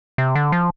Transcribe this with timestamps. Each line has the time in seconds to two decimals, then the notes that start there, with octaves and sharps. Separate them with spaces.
0.18 C3
0.35 D3
0.52 F3